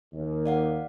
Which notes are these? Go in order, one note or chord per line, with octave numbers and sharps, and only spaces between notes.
D#2
D5 F5 F#5